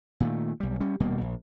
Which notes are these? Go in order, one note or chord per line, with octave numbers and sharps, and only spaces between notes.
A#2 D#3 A3
B1 G3
G3 C#4
D#1 B2 G3 A#3
A#1